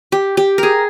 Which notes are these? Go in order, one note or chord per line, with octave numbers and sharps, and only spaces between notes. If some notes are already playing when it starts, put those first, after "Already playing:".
G4
G4
G#4 A#4